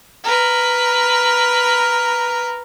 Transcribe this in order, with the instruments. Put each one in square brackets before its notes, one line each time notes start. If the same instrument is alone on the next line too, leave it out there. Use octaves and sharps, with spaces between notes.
[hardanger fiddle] A#4 B4